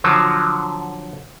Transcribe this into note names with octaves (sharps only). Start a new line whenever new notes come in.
D3 F3 F#3